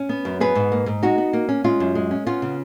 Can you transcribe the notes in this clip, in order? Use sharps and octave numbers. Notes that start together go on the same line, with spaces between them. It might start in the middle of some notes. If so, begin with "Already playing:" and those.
Already playing: C#4
B3
F#2
B3 G#4 B4
G#2
A#3
G#2
G#3 D#4 F#4
B3
A#3
C#4
G#3 C#4 F4
F#2
G#3
C#4
B3 C#4 F4
C#3